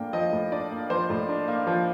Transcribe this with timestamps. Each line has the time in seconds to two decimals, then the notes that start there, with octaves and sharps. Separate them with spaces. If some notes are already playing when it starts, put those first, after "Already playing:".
Already playing: A2 F3 A#3 D4 G5
0.13 F3 D#5
0.32 A2
0.52 D4 D5
0.71 A#3
0.90 F3 C5
1.10 A2
1.29 D4
1.48 A#3
1.67 F3